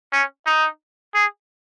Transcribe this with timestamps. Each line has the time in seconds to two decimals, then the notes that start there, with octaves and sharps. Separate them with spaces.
0.13 C#4
0.46 D#4
1.14 G#4